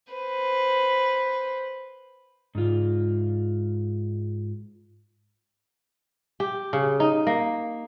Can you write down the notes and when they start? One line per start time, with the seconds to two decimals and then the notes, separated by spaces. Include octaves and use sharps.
0.13 B4 C5
2.55 G#2 F4
6.40 G4
6.73 C#3
7.00 D#4
7.27 A#3